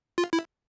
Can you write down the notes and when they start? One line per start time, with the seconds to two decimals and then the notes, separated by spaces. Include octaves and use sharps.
0.18 F4
0.33 E4